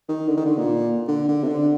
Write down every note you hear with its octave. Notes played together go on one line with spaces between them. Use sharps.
D#3
D3
D#3
D3
A#2
D3
D3
C3
D3